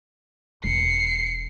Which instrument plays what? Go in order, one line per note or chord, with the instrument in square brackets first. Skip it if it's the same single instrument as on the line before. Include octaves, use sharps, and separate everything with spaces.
[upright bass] E1 [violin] C7 C#7